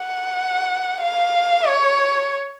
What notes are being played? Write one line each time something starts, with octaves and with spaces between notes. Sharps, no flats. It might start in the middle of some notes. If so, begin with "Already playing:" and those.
Already playing: F#5
F5
C#5